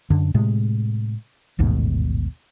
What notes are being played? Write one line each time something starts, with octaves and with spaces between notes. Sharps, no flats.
F#2 D3
A2 C3 G#3
A1 D#2 G#2 B2